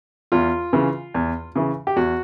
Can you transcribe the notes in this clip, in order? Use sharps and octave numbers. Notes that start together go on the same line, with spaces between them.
E2 F4
C#3 E3
E2
C#3 E3
G4
E2 F#4